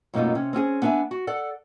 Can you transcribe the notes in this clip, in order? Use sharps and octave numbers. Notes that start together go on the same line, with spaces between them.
F#2 B2 A3 A#3 D#4 F4
C3 C#4
C4 C#4 G4 G#4
B3 D4 E5 G5 G#5
F#4
A4 D5 F#5